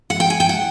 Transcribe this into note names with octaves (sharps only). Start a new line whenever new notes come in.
F#5
G5
G#5
G5
F#5